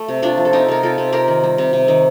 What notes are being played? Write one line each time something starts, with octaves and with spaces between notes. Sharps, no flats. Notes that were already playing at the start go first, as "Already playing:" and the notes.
Already playing: A3
C3
C3 D4 F4
F3
A4
C3 D#4 G4
C3 A#4
C3 F4 A4
C3
C3 G4 A#4
D#3
G3
C3
C3
D#3